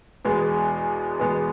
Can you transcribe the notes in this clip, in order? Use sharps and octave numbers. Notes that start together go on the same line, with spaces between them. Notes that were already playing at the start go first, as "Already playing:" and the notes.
E2 B2 G#3 B3
E2 B2 G#3 B3